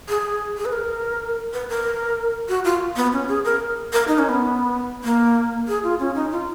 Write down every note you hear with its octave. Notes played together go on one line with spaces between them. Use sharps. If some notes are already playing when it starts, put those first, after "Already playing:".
G#4
G#4
B4
A#4
B4
A#4
F#4
F4
B3
C#4
G#4
A#4
A#4
D#4
C#4
B3
A#3
G#4
F4
C#4
D#4
F4